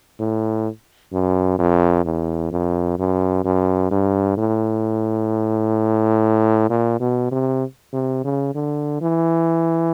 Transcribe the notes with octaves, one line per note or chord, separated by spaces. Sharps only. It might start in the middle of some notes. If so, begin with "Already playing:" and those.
A2
F#2
F2
E2
F2
F#2
F#2
G2
A2
A#2
B2
C3
C3
C#3
D3
E3